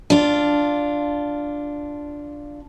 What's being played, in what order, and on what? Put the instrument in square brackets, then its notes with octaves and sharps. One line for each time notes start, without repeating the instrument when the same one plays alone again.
[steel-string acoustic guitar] D4 F4